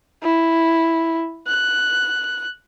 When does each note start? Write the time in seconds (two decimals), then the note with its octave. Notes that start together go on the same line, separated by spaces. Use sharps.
0.23 E4
1.47 F#6